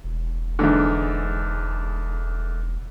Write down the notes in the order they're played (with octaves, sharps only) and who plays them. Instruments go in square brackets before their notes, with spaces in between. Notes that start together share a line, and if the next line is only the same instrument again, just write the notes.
[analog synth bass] E1
[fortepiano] E2 G#2 D3